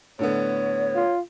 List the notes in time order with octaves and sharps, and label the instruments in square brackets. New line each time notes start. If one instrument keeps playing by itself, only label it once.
[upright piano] A2 D3 B3 [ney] C#5
[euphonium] F4